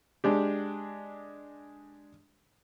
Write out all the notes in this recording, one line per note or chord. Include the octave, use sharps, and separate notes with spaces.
G#3 D4 G4